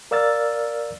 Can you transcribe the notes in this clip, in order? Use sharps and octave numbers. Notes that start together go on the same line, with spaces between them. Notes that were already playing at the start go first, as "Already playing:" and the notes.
A#4 D5 F5 E6 F6 A6